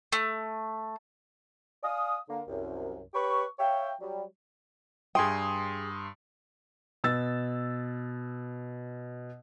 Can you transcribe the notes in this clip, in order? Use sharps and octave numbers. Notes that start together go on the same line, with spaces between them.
A3
D5 F5 G#5 D#6
D3 A#3
C2 F#2
G4 B4 C#5 B5 C#6
C#5 E5 F5 G5
F#3 G3
G2 G#4 G5 C6 D#6
B2 E6 A6